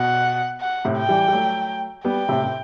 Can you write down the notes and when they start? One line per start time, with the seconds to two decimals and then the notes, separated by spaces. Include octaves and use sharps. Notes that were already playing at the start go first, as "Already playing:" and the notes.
Already playing: B2 F#5
0.61 F#5
0.85 A2 C3
0.97 G5
1.09 E3 G3
1.28 G3
1.33 F#3 A3
2.04 G3 B3 G5
2.29 A2 C3
2.44 C3